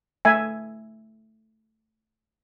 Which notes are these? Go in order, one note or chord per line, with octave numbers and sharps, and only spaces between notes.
A3 E5 G#5